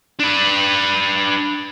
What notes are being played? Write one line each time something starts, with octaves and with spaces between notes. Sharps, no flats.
D4 B4